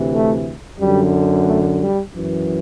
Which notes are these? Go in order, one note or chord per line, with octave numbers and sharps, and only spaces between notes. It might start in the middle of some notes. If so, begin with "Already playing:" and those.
Already playing: D2 C3 E3
A3
F#2 D3 G3
A3
G3
F#2 E3